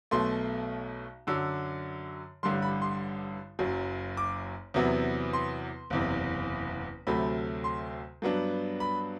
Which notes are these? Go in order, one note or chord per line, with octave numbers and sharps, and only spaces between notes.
B1 B2 A3 C6
F#2 D3 F#3 E6
A1 G2 D3 G3 C6
B5
C6
F#1 F#2 F#3
D6
E2 C3 F#3 B3 E4
C6
F#1 E2 C3
D2 C3 F#3 A3 B5
C6
G2 F#3 B3 D4
B5